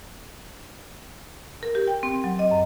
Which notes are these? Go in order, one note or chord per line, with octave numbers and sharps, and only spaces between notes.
A#4
G4
G5
C4
F#3
D#5
F#2